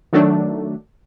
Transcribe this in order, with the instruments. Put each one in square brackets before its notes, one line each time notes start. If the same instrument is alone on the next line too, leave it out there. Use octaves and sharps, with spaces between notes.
[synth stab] D#3 F#3 A3 D4